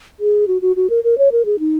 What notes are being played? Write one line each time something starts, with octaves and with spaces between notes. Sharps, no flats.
G#4
F#4
F#4
F#4
A#4
A#4
C#5
A#4
G#4
D#4